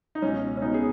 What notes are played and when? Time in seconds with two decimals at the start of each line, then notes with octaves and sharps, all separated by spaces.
0.15 D#4
0.22 C#2 B2 C#4
0.57 C#4
0.62 C#2 B2 B3 D#4
0.74 G#4